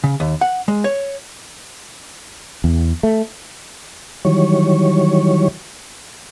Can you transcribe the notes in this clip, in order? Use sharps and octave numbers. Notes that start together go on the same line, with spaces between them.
C#3
D#2
F#5
G#3
C#5
E2
A3
D#3 E3 F#3 G3 C#5